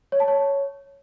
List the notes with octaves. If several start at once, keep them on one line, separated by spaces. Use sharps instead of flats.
C#5
A5
C#5